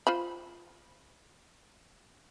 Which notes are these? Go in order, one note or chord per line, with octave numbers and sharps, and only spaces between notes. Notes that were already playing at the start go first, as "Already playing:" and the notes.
F4 C5 B5